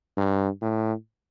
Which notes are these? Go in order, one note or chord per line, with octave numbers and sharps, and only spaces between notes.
G2
A2